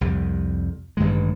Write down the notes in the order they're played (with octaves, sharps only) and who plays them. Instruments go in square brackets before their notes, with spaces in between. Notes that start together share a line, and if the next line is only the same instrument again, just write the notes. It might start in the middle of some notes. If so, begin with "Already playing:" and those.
[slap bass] C2 F2 G3
A1 G2 D#3 G#3